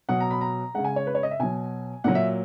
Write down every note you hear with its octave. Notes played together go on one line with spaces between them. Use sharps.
B2 F#3 F#5
A#5
B5
A#5
C#3 G#3 F#5
G#5
C#5
B4
C#5
D#5
E5
B2 F#3 G#5
A#2 F#3 F#5
E5